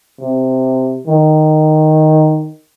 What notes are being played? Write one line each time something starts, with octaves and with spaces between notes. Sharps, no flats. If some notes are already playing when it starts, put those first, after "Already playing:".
C3
D#3